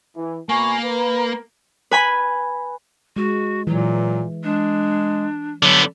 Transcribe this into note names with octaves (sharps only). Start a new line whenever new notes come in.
E3
B2 A#3 G#5 B5 C#6
A#4 B4
B4 G#5 B5
G#3 F#4
A#2 E3 F#3
G#3 D4
D3 F#3 B3